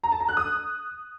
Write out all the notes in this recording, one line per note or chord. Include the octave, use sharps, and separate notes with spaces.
A#5
A5
A#5
F#6
D#6